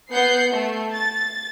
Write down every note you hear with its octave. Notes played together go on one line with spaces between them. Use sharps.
B3 F#5 G6 C7
A3
A6